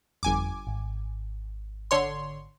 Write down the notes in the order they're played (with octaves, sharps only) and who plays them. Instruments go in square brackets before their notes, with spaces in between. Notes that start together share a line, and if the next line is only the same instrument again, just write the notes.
[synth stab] G1 G#5 D6 [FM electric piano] F2
[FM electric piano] G#1
[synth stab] D3 C#5 C6